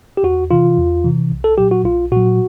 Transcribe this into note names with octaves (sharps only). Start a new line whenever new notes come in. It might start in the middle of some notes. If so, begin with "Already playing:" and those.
G4
E2 F#4
C3 E3 F4
E2
C3 E3
B1
A4
A#2 F#3 G4
F#4
B1 F4
A#2 F#3 F#4